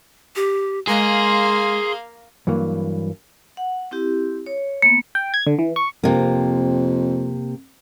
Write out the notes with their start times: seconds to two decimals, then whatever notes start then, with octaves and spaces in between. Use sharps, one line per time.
0.36 G4
0.87 G#3 A#3 G#4 F5 C6
2.47 G2 E3 F#3 A#3
3.57 F#5
3.91 C4 E4 G4
4.46 C#5
4.82 A#3 B3 C#7
5.15 G5
5.34 G#6
5.47 D3
5.59 E3
5.76 C#6
6.03 F2 C3 A#3